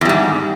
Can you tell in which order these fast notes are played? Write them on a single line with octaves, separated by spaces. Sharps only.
E2 G3 G#2